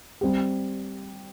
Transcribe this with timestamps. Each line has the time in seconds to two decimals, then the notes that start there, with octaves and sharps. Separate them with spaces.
0.21 G3 C4 G4